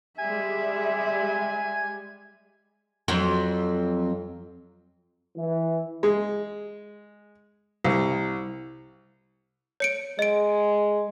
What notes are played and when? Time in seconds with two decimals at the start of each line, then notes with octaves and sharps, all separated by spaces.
0.19 G3 G#3 E5 G#5
3.08 F2 F#3
5.37 E3
6.03 G#3
7.84 C2
9.80 C#5 C#7 D7
10.19 G#3 D#5 D7